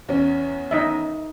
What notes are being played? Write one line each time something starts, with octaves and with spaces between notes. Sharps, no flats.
E2 C#4
D#4 D#5 E5